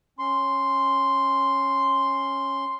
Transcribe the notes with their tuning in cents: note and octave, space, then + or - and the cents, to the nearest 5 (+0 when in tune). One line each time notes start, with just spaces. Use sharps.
C#4 -10 C6 +0